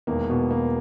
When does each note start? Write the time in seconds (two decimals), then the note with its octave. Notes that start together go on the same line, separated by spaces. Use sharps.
0.07 E1 E2 D#3 A#3
0.30 B2 B3
0.51 A#3